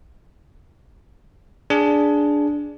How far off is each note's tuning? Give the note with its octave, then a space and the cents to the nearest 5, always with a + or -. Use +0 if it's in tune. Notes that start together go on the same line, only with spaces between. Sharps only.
D4 -5 G#4 +0